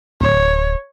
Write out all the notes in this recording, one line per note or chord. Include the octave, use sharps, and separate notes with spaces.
D1 C#5